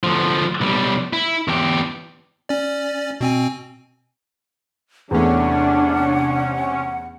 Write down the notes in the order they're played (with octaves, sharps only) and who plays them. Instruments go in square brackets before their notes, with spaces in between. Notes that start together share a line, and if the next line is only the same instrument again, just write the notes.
[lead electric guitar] D2 F3
B1 G3
E4
E2 G4
[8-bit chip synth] C#4 D5
B2 C4 G#5
[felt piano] E2 A3 [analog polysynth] C3 C#4 [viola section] D4 [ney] F#5